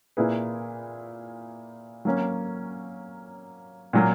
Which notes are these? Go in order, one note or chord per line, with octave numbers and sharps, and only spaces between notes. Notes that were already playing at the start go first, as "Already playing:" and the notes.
A#2 A#3 E4 G#4 B4
F#3 A#3 C#4
A#2 F#3 A#3